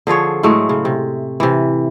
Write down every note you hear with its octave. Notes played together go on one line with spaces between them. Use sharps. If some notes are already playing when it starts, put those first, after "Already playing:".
D3 F3 G#4 C#5
A2 F#3 G#3 A3
C#3
C3
C3 E3